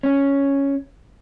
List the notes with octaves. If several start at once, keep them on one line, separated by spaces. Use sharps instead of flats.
C#4